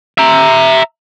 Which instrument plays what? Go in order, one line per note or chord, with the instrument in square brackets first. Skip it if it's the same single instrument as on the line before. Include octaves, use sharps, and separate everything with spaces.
[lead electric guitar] E5 A#5